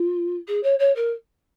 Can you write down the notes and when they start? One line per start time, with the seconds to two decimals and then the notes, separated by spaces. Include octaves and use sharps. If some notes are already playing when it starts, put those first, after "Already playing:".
Already playing: F4
0.47 G#4
0.63 C#5
0.79 C#5
0.95 A#4